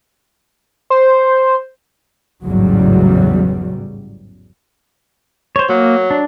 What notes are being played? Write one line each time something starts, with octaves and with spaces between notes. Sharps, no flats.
C5
A1 E2 G#2 C#3 F#3 G3
C5 C#5
F#3 A#3
D4